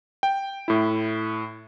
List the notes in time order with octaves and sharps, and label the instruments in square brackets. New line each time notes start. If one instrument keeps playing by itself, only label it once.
[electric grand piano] G5
A2 E4